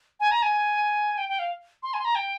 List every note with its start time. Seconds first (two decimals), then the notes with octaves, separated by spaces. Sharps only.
0.20 G#5
0.31 A#5
0.42 G#5
1.18 G5
1.29 G5
1.39 F5
1.83 C6
1.94 G#5
1.99 C6
2.05 A#5
2.15 G5